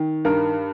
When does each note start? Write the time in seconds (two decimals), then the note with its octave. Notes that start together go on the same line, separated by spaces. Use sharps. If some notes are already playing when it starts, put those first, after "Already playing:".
Already playing: D#3
0.25 G2 A#4